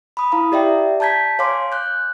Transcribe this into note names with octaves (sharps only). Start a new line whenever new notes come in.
B5 D#6
E4 F5 A#5 D#6
G4 D5 E5 G5
A5 A#5 G6 G#6 B6
C#5 F5 G#5 C6 D6
F#6 G6